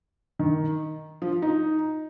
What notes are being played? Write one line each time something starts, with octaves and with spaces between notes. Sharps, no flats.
D#3
F3
D#4